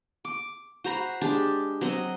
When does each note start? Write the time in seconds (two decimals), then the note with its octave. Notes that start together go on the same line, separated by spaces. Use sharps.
0.25 D6
0.84 F#4 C5 A#5 B5
1.21 G#3 D4 G4
1.81 F#3 C4 D#5